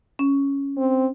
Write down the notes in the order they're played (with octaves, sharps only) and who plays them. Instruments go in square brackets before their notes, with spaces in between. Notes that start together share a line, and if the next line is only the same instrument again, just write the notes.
[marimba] C#4
[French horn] C4